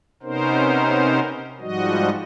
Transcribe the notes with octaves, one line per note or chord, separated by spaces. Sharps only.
C3 B3 C#4 D#4 A#4 C5
G#2 F3 G3 F#4 D#5